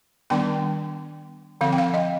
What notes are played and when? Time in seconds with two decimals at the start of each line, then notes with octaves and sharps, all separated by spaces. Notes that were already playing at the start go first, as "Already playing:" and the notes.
0.30 D#3 G3 B3 D4 G5
1.61 D3 F3 C4 F5
1.73 G5
1.78 F5
1.94 D#5